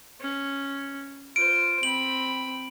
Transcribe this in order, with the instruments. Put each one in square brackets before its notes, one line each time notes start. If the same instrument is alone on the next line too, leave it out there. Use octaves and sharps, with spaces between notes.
[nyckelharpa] C#4
[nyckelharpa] F4 C5 [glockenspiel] D7
[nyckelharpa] C4 B5 [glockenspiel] F#7